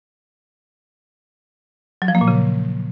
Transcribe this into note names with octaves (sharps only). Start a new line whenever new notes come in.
F#3
F3
A#3
A#2
C#3